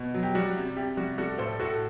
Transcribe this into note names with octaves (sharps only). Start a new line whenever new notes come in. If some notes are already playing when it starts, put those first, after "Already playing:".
Already playing: B2
F#3
G4
G3 F#4
C3
C3 G4
G3 F#4
G3 F#4 A4
A2 A4 C5
A2 F#4 A4